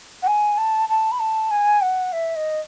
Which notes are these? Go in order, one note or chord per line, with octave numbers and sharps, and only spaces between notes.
F#5
G#5
A5
A5
B5
A5
G#5
F#5
E5
D#5